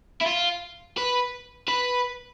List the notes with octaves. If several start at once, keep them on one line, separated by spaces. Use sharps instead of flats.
E4
F4
B4
B4